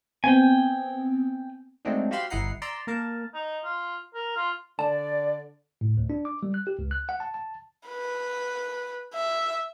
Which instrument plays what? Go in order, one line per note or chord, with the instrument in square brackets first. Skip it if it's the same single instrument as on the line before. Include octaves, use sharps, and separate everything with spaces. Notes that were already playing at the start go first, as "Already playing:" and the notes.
[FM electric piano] B3 C4 [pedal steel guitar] G5 G#5
[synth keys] F#3 G#3 A3 C4 D4 D#4
F#4 G4 C5 F5 B5 C6
G1 E4 D#5 F#5 A#5 C7
D5 A#5 C6 E6
A#3 A#4 A5
[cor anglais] D#4
F4
A#4
F4
[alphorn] D3 [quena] D5 [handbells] A5
[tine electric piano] A2
D2
D4
D6
G3
F#6
G4
C#2
F#6
F#5
A5
A5
[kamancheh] B4
E5